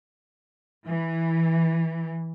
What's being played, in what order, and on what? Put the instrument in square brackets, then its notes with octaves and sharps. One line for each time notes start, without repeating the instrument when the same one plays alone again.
[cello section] E3